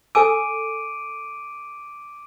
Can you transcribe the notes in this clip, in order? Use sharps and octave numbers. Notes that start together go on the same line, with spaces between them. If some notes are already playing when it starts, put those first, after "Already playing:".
A4 G#5 D6 E6 D7 D#7